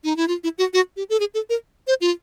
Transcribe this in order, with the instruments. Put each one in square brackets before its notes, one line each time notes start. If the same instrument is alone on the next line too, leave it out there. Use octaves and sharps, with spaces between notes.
[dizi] D#4
E4
F4
E4
F#4
F#4
G4
A4
G#4
A4
A#4
C5
F4